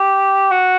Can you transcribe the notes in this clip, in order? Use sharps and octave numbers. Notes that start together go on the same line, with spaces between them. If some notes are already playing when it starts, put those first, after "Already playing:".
Already playing: G4
F#4